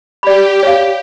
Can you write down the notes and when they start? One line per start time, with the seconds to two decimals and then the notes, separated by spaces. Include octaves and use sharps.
0.23 G4 D5 B5
0.63 C#5 F5